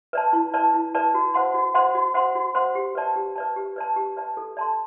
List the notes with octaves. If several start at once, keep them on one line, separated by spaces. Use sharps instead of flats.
B4 D5 A5
E4
B4 D5 A5
E4
B4 D5 A5
F#4
C5 F#5 C6
F#4
C5 F#5 C6
F#4
C5 F#5 C6
F#4
C5 F#5 C6
G4
B4 D5 A5
G4
B4 D5 A5
G4
B4 D5 A5
G4
B4 D5 A5
A4
D5 A5 C6